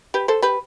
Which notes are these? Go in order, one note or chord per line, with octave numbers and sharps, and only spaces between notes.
G4 B4
A4 C5
G4 B4